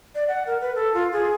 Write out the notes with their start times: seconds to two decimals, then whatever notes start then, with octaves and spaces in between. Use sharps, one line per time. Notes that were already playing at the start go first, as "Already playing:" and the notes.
0.15 D5
0.28 F#5
0.47 A#4
0.61 B4
0.75 A4
0.94 F4
1.13 G#4